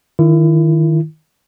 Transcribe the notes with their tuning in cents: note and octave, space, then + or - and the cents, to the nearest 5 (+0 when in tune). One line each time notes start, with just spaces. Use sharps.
D#3 +0 E4 +35